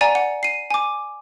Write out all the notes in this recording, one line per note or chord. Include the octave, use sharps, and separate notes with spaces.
D5 F#5 G#5 A#5
F#5
C7 D#7
G#5 D6